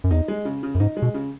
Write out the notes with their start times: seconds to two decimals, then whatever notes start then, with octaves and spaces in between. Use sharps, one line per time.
0.04 F#2
0.11 E2 D#4
0.28 G#3
0.45 C#3
0.63 C#3
0.75 F#2
0.80 G#2 D#4
0.97 G#3
1.02 B2
1.14 C#3